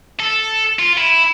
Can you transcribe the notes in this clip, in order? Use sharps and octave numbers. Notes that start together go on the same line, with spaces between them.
A4
F4
E4